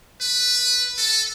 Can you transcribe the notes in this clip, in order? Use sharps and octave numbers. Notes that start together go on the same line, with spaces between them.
B4
A4